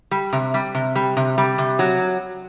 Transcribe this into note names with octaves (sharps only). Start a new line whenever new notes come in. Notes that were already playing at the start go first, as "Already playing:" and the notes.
G3
C3
G3
C3
G3
C3
G3
C3
F#3